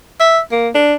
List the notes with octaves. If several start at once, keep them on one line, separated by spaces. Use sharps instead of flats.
E5
A#3
D4